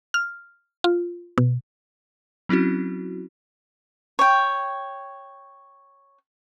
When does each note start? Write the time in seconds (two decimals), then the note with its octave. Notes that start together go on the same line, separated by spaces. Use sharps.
0.14 F6
0.84 F4
1.38 B2
2.49 F#3 C4 C#4 E4 F#4
4.19 C#5 G5